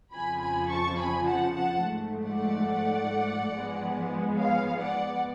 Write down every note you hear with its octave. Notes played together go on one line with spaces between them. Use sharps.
F2 C#3 F3 G#5 B5
G#5 B5
A5 C#6
G#5 B5
F#5 A5
F#5 A5
G#2 F3 A3
D5 F#5
G#2 F3 G#3 B3
C#5 F5
D5 F#5